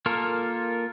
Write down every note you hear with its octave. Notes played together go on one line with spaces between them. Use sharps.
A#3 F4 A4 A#4